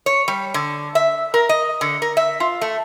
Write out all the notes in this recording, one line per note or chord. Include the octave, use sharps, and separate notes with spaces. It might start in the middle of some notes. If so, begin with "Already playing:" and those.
C#5
G3
D3
E5
A#4
D#5
D3
A#4
E5
F4
A3